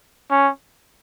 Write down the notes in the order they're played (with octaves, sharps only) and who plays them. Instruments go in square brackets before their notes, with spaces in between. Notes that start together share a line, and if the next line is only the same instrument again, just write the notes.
[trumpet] C#4